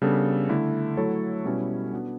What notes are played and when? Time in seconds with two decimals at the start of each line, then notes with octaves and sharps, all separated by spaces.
0.02 C#3 G3 B3 D4 A4
0.49 D3 A3 E4
0.97 F#3 A3 E4 A4 C#5
1.45 B2 G3 C#4 E4 B4
1.93 B3 D4 F#4